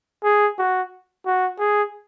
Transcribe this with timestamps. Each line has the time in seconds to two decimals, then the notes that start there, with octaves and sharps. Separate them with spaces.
0.24 G#4
0.59 F#4
1.26 F#4
1.59 G#4